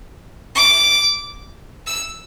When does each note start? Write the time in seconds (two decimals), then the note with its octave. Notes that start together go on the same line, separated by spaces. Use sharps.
0.56 D6
1.87 E6